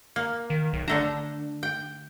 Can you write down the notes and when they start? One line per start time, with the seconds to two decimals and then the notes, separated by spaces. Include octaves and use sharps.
0.16 A#3
0.50 D#3
0.73 B1
0.88 D3 A3 D4 A#5
1.63 G5